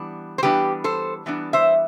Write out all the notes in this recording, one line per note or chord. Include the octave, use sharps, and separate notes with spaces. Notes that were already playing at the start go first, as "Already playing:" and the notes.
Already playing: E3 G3 B3 D4
C5
E3 G3 B3 D4 G4 B4
A4 C5
E3 G3 B3 D4
C5 E5